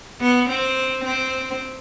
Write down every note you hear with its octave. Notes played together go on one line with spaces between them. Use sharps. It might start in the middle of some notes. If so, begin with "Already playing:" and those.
B3
C4
C4